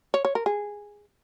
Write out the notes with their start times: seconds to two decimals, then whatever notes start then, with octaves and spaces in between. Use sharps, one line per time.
0.14 C#5
0.25 C#5
0.35 A#4
0.46 G#4